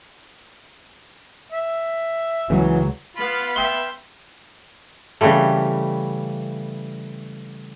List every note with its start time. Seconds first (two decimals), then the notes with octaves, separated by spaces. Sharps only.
1.52 E5
2.50 C#2 C#3 E3 F#3
3.16 B3 F4 F5 B5
3.56 E5 G5 C6
5.21 C#3 E3 G3 A3